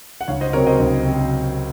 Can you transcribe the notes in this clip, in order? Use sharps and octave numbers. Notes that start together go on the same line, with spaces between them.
F#5
C#2 C#5 F5
C5 D#5
C3 F#3 C4 A#4 C#5
C5 D#5
C#2
C3 F#3 C4